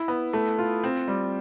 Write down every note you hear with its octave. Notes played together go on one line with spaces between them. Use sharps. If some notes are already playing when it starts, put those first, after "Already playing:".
Already playing: E4
B3
A3
F4
C4
G3